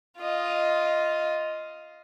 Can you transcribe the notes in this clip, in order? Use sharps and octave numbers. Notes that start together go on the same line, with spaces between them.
F4 D#5